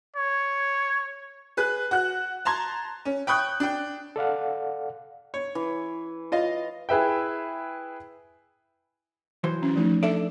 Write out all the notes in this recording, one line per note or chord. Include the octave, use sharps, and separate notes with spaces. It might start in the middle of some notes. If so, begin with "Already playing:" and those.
C#5
G#4 B4 F#6
F#4 F#6
A5 A#5 C6 G#6
C#4
G5 B5 C#6 D#6 F#6 G6
D4 G5
A4 D5 F5 F#5
C#5
E3
F4 D#5 F5
E4 G#4 B4 E5 G5
E3 F#3 C5
C#4
F3 A3 D#4
D4 A4 D5 E5